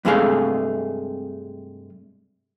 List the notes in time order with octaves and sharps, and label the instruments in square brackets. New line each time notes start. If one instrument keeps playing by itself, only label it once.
[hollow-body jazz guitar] G2 C3 G#3 A3 G#4 F5